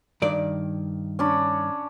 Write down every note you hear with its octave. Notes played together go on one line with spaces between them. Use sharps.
G2 D#3 D5
C#4 D4 B5